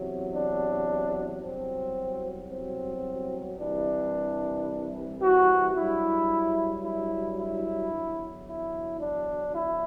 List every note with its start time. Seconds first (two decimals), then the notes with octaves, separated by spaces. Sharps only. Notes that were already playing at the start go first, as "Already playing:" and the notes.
Already playing: E2 C3 F#3
0.34 D4
1.42 C2 B2 F#3 C4
2.50 C4
3.58 C2 C3 E3 D4
5.21 F#4
5.75 G2 F#3 E4
6.83 E4
7.38 E4
7.92 E2 D3 F#3
8.46 E4
9.00 D4
9.55 E4